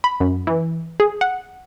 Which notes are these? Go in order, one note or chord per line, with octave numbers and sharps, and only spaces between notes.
B5
F#2
E3
G#4
F#5